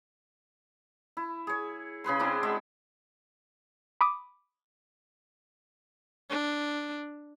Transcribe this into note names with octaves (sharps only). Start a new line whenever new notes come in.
E4
G#4 C#5
C#3 G#4 B4 C6
C4 D4 E4 D5
G#3 F#4 E5
B5 D6 D#6
D4